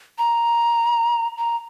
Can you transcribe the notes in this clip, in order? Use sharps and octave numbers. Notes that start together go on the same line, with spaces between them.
A#5
A#5